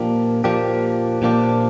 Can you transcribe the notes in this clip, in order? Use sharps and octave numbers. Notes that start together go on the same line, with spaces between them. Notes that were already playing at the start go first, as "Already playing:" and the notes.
Already playing: A#2 F3 A#3 D4 G4
A#2 F3 A#3 D4 G4
A#2 F3 A#3 D4 G4